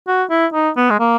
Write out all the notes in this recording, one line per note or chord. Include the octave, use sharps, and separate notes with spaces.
F#4
E4
D#4
B3
G#3
A#3